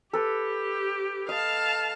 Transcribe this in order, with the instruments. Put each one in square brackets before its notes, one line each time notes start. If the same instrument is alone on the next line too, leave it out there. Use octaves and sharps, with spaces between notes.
[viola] G4 [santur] A4 B4
[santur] D#5 [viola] F5 A5